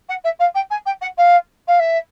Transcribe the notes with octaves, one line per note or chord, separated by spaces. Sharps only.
F#5
E5
F5
G5
G#5
G5
F#5
F5
F5
E5